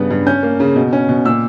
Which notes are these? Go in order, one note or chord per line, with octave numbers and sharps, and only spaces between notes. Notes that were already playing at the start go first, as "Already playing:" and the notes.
Already playing: G2 C#3 B3
G2
C#4 G6
A#3
C#3
B2
C#4
B2
A#2 E6